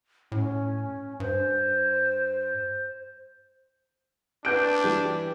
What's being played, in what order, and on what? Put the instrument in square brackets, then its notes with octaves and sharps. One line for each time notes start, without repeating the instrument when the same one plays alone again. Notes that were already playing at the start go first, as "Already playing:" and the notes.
[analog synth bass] A2 [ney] C#4
[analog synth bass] G2 [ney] C5
[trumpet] D4 [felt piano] B4 G6 D7
[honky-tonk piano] E3 G3